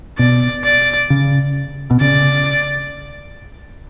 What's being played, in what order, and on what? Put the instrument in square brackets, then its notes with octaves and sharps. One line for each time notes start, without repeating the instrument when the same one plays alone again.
[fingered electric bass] B2 [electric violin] D5
[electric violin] D5
[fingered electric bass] C#3
B2
[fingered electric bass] C#3 [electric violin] D5